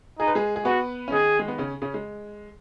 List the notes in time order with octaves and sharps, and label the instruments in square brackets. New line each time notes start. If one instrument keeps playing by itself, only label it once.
[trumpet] D#4 [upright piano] G#4
[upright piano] B4
G#3 G#4
G#4
[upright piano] B3 B4 [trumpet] F#4
[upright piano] C#4
[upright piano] D#3 D#4 [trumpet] G#4
[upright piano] G#3
B3
C#3 C#4
C#3 C#4
G#3